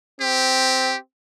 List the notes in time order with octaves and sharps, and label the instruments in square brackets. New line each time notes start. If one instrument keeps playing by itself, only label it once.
[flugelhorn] C4 [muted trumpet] G4